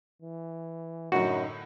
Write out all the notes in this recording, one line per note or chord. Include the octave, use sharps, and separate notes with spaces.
E3
F#2 A2 D3 F#3 D#4 F#4